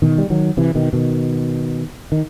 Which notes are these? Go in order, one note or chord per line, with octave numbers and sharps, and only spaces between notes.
B2 D#3
G3
D#3 F#3
C3 E3
B2 D#3
B2 D#3
D#3